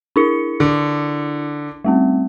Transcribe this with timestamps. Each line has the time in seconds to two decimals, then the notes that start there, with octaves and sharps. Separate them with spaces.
0.16 D4 E4 C#7
0.60 D3
1.84 G3 A3 C4